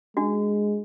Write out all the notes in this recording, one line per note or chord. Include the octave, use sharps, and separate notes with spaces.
G#3 D4 F#4